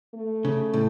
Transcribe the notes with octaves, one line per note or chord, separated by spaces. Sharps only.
A3
C#3
A2